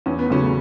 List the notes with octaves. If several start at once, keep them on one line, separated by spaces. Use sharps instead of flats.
E2 C#4
B3
C#3 F#3 A3 C#4